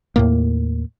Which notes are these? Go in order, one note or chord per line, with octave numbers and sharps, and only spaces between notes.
D#2 A2 A#3